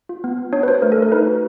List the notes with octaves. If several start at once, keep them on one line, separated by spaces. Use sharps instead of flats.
F4
B3
B3
D4 C#5
B4
F#4 C5
A3 A#4
A4
A3 A#4
D#4 B4
F#4